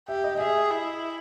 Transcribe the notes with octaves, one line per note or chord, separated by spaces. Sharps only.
G4 E5
D#5
D#5
G#4 E5
E4